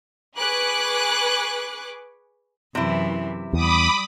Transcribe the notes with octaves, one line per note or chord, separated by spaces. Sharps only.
G#4 B4 C#6 D6 F#6
F#2 C3 E3 E4
E2 G3 B5 D6 D#6